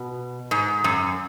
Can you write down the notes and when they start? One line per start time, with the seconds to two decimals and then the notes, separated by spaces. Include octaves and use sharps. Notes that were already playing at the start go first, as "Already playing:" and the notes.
Already playing: B2
0.51 G#2
0.84 F#2